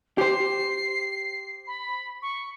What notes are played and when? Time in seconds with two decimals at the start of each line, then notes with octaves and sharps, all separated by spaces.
0.18 G4 C5 C7
1.67 B5
2.22 C#6